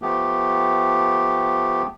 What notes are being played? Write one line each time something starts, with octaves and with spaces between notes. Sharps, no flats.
F3 A3 B3 G4